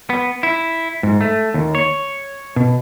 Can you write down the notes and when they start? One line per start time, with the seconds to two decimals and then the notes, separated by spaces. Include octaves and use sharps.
0.10 B3
0.43 E4
1.03 G#2
1.21 A3
1.54 D#2
1.75 C#5
2.56 B2